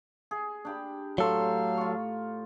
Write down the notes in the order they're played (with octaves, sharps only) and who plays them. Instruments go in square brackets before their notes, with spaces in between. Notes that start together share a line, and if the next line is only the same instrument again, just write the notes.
[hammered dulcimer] G#4
D4 G4 B5
[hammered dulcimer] A2 A#5 C6 [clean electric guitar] F#3 A4 [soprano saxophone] F5
[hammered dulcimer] F4 C#6